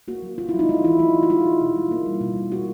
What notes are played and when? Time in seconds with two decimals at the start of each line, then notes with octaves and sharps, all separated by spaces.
0.08 A#3 F#4
0.22 F#3
0.38 A#3 F4
0.49 E4
0.54 F#3
0.59 D#4
0.69 G#3 F4
0.84 E3 E4
0.99 A3 F4
1.14 E3
1.23 F#4
1.29 G#3 F4
1.46 E3
1.61 B2
1.76 G#3
1.91 A#3
2.06 G3
2.21 B2
2.36 G#3
2.52 A#3 F#4